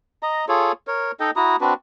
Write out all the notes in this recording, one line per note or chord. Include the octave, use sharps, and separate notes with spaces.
D#5 A#5
F4 G#4 A4 C#5
A#4 C#5
D#4 A4 D#5 G5
E4 F#4 A#5 D#6
C4 D4 F#4 B4